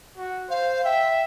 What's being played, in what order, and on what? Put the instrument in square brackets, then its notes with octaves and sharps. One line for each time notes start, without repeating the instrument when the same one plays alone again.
[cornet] F#4
[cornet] C5 [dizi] F5
[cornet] E5 [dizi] G5